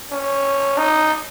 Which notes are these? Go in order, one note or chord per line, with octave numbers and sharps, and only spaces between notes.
C#4
D#4